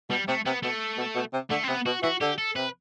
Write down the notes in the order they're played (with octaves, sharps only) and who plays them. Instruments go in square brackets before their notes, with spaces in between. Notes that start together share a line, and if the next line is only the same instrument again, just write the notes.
[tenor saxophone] B2 [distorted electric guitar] G3
[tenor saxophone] C3 [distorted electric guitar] A3
[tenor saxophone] C3 [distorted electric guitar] B3
[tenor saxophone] B2 [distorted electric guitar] A3
[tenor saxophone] B2
B2
C3
[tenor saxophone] D3 [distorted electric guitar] A3
[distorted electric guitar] C4
[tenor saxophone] C3 [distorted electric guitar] B3
[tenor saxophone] B2 [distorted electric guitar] F#4
[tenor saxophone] E3 [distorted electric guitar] F#4
[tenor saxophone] D3 [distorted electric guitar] G4
[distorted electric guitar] A4
[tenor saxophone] C3 [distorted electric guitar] B4